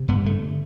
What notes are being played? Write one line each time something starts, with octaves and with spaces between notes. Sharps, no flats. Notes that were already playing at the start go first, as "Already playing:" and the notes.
Already playing: C3
G2 B3
D3 A3